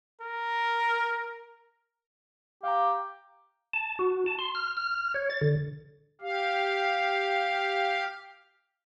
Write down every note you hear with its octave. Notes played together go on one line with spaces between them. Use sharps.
A#4
G4 F5 A#5
A5
F#4
A5
C6
F6
F6
C#5
A6
D3
G4 F5